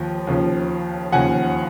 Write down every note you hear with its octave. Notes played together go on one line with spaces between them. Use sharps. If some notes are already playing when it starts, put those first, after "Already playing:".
Already playing: D#2 F3
D#2 C#3 F3
D#2 C#3 F3 F#5 G#5